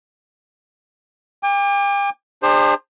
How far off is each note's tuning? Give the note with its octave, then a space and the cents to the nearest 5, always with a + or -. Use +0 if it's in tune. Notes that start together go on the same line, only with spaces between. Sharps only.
G5 +45 D6 +0
D4 +35 G#4 -45 C5 +15